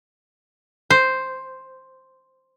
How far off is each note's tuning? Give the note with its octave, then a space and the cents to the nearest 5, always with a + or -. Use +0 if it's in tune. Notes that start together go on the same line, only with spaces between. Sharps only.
C5 +0